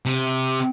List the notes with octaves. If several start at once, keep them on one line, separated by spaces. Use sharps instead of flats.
C3